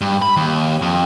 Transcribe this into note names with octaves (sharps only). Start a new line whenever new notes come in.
G2
B5
D#2
F2